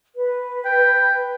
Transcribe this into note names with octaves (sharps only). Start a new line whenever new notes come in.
B4
G5